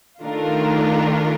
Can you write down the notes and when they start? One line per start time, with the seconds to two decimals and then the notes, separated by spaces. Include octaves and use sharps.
0.23 D#3 A3 D4 F4 A#4